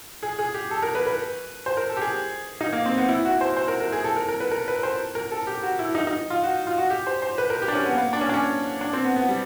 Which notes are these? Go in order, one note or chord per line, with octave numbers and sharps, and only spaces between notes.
G#4
G#4
G4
A4
A#4
B4
B4
C5
A#4
A4
G4
G#4
D#4
A#3
C4
B3
E4
F#4
C5
C5
A#4
A#4
G#4
A4
A#4
A#4
B4
A#4
B4
C5
A#4
A4
G4
F#4
E4
D#4
D#4
F4
F#4
F4
F#4
G4
C5
C5
B4
A#4
G4
D4
C#4
B3
A#3
B3
D4
C#4
D4
C#4
D4
C4
B3
B3
G3